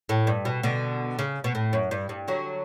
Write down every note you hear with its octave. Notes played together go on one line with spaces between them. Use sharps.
A2
G2
B2
B2 D3
C#3
B2
A2
F#2
G2
G2
D3 F#3